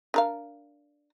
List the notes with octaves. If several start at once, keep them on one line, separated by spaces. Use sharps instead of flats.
D4 A#4 F5